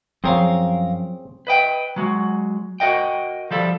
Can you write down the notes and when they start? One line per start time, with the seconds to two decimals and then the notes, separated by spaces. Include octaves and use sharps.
0.24 F#2 F3 C4 G#4 A#4 C#5 F5
1.47 B4 D#5 G5
1.96 F#3 G#3 F#4
2.80 F#4 A#4 D#5 G5
3.51 F3 G3 A4